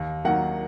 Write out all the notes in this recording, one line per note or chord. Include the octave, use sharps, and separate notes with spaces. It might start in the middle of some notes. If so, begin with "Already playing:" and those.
Already playing: D#2
D#3 F#3 A#3 F#5